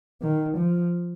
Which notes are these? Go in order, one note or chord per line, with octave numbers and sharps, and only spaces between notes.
D#3
F3